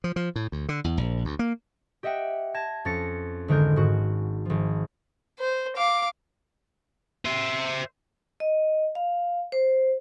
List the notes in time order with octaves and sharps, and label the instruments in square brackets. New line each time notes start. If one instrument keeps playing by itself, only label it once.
[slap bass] F3
F3
A2
D2
D3
E2
A#1
D2
A#3
[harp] G4 D#5 E5 F#5 G5
A5 G#6 A#6 E7
F2 C#4 A6 A#6 C#7
G#1 D3 G#3 A#4 G6
G#2 F#4
G#1 F3
[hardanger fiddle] C5
F5 D6
[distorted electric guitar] C5 E5
[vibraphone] D#5
F5
C5